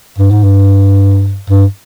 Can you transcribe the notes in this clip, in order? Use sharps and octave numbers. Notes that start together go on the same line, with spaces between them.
G2
G#2
G2
G2